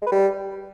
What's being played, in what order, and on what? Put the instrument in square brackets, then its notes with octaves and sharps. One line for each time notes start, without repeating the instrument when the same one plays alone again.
[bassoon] G#3
B4
G3